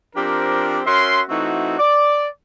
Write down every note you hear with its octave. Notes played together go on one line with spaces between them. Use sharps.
F3 C4 D4 G4 A#4
C#4 F#4 A#4 E5 C6
E3 A3 C4 D#4 F#4
D5